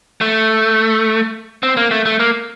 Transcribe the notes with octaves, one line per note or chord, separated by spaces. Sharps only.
A3
C4
A#3
A3
A3
A#3